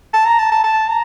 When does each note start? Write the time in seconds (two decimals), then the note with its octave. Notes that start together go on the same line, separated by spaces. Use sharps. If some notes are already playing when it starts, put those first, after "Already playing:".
0.14 A5
0.27 A#5
0.39 A5
0.52 A5
0.64 A5
0.88 A#5